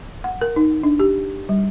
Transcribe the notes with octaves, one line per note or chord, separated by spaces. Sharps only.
F#5
A#4
D#4
D4
G4
G3